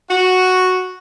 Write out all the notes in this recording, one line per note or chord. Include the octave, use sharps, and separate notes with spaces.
F#4